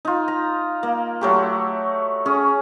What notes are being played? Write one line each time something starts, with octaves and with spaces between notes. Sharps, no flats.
D#4 F4
A#5
A#3
F#3 A3 G4
C#4 G#4